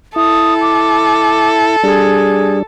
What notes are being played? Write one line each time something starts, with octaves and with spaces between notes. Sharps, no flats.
E4 A4 D#6
D6
G3 D4 G#4